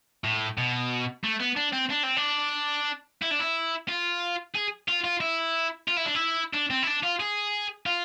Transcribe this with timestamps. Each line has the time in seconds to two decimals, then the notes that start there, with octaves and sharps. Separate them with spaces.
0.24 A2
0.58 B2
1.24 A3
1.40 B3
1.57 D4
1.73 C4
1.90 D4
2.03 C4
2.17 D4
3.22 E4
3.31 D4
3.40 E4
3.88 F4
4.55 G#4
4.88 F4
5.04 F4
5.20 E4
5.88 F4
5.97 E4
6.05 D4
6.14 E4
6.53 D4
6.70 C4
6.83 E4
6.87 D4
7.03 F4
7.20 G#4
7.86 F4